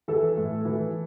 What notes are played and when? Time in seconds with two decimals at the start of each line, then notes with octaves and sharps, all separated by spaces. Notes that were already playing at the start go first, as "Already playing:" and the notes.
0.08 E3 A4
0.37 A2
0.65 E3